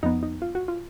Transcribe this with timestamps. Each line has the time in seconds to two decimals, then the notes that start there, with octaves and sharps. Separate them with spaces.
0.03 F2 F3 B3 D#4
0.23 D#4
0.42 F4
0.55 F#4
0.68 F4